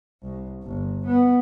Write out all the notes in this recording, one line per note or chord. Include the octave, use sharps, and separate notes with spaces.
C2
G1
B3